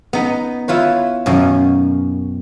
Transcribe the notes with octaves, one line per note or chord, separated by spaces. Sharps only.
B3 D#4
E4 F4 B4 C#5
F#2 B2 D#3 C#4 F5